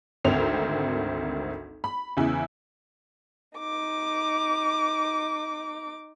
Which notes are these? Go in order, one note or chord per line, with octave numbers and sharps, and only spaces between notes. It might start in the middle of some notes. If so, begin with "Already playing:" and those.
G#1 D2 C4 A#4 F7
B5
E2 C#3 E3 E4 G#4
D#4 D6